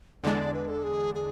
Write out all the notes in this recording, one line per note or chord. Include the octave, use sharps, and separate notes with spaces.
E2 D3 G#3 D4 D5
B4
A4
G#4
G#4